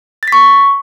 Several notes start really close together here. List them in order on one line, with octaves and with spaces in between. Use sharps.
A6 B6 C#6